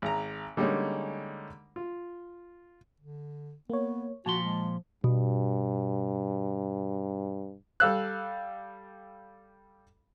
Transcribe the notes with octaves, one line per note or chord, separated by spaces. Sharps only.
G#1 A#5
D3 G3 G#3 A#3 C#4 D#4
F4
D3
A#3 B3 C#5
A#2 F3 F#4 A5 C6
G#3
G2 B2
G3 A4 F5 E6 F#6